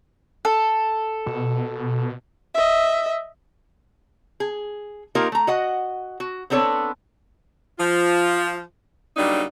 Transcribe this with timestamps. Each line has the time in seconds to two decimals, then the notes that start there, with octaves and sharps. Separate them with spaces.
0.45 A4
1.26 B2
2.54 D#5 E5
4.40 G#4
5.15 A#3 D#4 F4 G4 A#4
5.32 A3 A#5
5.47 F#4 D#5 F#5
6.20 F#4
6.50 B3 C4 D4 A4 C#5
7.79 F3 F4
9.17 C#3 F#3 G3 A#3 D4 D#4